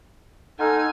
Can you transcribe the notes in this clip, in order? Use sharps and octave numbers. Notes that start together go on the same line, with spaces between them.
D#4 A4 F#5 G#5 C6 F6